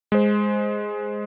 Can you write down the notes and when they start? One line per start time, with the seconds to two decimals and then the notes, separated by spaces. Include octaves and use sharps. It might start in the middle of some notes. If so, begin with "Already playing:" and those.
0.12 G#3 C5